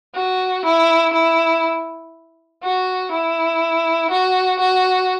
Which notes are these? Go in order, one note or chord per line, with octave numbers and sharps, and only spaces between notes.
F#4
E4
E4
F#4
E4
F#4
F#4